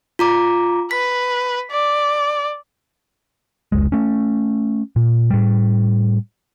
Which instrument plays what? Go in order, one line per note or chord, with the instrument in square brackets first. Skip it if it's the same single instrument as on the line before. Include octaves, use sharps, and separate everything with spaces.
[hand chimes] F4 A#5 D6
[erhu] B4 [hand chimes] B6
[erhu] D5
[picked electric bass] F1 C#2 G#3
A3 C#4
A#2
A2 G3